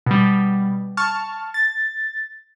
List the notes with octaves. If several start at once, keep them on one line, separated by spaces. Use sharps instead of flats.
B2 G3
A5 C#6 F6
A6